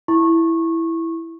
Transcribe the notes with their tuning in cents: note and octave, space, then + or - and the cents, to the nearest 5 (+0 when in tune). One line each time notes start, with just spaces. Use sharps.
E4 +0 C#6 -20